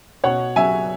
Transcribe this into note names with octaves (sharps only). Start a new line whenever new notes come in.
B2 C#5 F#5
F#3 E5 G#5